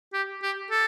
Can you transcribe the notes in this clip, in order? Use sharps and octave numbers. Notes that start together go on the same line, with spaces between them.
G4
G4
A4